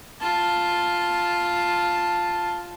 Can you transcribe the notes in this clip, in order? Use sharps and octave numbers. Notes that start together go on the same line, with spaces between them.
F4 A5